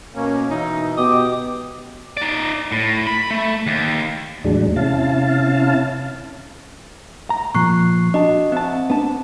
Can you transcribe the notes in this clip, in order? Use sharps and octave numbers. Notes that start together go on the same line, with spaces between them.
B2 A#3 C#4
B2 E3 D#4
B2 G4 D#5 D6
D#4 D5
A2
B5
A3
D#2
E2 A2 F#3 G#3 D4
C3 C#4 E4 F5 A5
A#5
A#2 F3 C#6 F#6 C7
D4 F#4 D#5 A5
C4 E5 A5
B3 D4 A5